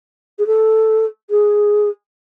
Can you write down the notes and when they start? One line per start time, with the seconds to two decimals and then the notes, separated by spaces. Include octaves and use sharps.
0.38 G#4
0.46 A4
1.30 G#4